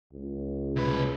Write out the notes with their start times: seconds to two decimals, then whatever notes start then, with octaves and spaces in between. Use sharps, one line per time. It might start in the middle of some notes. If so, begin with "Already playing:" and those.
0.13 C#2
0.76 C2 B4